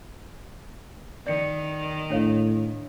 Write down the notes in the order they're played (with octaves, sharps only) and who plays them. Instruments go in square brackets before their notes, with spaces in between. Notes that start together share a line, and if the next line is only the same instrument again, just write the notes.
[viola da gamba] D#3 [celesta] D5 C#7
[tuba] A2 [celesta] D4 C#5 F5